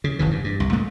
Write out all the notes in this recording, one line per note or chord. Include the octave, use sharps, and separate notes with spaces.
C#3
F1 D#3 E3
G2
G2
C2
A#2 G#3 A3